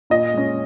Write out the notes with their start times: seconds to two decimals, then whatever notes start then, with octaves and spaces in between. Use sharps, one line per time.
0.10 A#2 D#5
0.34 G#3 C#4